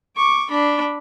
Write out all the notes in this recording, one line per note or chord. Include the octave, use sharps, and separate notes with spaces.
C#6 D6
D4 B5